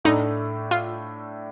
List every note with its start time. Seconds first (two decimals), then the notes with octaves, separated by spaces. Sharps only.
0.05 A2 A3 D4 D#4
0.71 F4